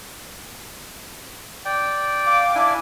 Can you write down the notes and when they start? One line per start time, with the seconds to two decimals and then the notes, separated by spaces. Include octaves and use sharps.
1.65 D5 G5
2.25 F5 D6
2.55 D4 E4 G#5